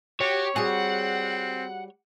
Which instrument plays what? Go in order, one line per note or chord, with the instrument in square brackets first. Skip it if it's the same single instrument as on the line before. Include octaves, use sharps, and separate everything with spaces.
[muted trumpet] F#4 [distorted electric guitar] G4 [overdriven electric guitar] C#5
[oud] G3 F#4 G#4 [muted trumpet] C4 [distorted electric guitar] F#5